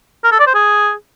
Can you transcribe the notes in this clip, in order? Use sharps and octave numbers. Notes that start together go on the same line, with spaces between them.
A#4
A4
D5
C5
G#4